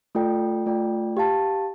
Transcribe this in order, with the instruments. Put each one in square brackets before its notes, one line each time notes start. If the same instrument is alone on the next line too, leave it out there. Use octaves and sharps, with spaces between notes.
[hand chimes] A3 F4 A4 D5 G5
A3 F4 A4 D5 G5
G4 F5 A5